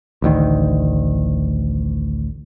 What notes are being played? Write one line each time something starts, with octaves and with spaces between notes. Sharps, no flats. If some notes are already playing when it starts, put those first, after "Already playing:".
A1 D2 D#3